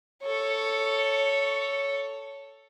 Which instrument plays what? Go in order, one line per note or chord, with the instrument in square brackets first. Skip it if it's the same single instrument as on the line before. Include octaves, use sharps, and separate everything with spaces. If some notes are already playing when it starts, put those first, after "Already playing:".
[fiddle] A4 C#5